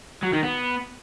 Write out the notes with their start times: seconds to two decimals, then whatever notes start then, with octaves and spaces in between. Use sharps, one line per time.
0.23 F#3
0.33 D#3
0.43 B3